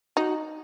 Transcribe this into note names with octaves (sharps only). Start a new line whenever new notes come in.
D#4 F#4